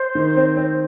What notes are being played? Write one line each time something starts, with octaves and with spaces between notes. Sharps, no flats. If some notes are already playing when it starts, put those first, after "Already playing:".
Already playing: C5
D#3
C4
C4